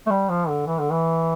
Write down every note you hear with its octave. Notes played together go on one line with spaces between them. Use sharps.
A3
G3
F3
D3
E3
D3
E3